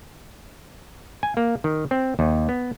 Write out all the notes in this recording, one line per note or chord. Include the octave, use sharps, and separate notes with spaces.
G#5
A#3
D#3
C4
D#2
B3